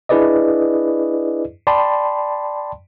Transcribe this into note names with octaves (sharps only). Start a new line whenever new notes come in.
D4 E4 G#4 B4 D5 D#5
D5 G5 A5 B5 C6